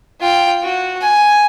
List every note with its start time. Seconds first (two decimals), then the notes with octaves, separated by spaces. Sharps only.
0.21 F4 G5
0.63 F#4
1.01 G#5